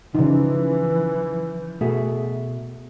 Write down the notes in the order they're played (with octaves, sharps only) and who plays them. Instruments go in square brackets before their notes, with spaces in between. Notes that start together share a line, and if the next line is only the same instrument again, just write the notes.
[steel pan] C#3 D#4 [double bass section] E3 [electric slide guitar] F3
[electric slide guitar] B2 G#4 E5 [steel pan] A3 F#4